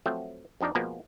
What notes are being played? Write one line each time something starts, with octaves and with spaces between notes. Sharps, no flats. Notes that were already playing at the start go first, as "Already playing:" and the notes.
F3 F#3 A3 C4
F2 F3 D4 D#4 D5
B2 F3 G#3 A#3 B3